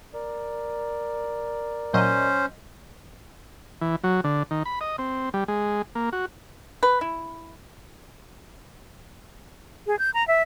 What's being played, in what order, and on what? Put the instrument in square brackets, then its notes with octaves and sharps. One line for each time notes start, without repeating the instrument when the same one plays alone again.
[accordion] A#4 D5
[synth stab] A#2 F#3 D#5 [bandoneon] C#4 C5
[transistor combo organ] E3
F#3
D3
D#3
B5
D#5
C4
G3
G#3
A#3
F#4
[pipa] B4
E4
[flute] G#4
G6
A#5
E5